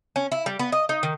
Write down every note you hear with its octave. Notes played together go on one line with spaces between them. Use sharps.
C#4
E4
G3
B3
D#5
D#4
D#3